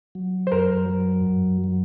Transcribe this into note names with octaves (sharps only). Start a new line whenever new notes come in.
F#3
C5
F#2 A#4
F#3
F#2
F#3